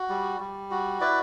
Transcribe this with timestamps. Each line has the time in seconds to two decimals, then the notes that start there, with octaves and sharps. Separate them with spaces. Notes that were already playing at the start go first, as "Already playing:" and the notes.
Already playing: F#4
0.10 G3
0.40 G3
0.71 F#4
1.01 E4 B4 D5